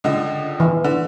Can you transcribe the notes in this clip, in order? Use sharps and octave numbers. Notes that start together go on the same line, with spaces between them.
C#2 D3 D#5
E3
D3